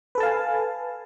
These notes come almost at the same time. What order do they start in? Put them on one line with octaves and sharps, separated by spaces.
B4 A4 A5 F5 G#5